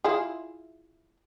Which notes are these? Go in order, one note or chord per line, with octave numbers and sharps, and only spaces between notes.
E4 F4 G#4